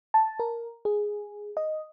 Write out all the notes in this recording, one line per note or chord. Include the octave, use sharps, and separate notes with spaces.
A5
A#4
G#4
D#5